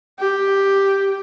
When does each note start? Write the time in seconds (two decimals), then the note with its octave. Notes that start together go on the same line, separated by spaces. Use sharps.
0.19 G4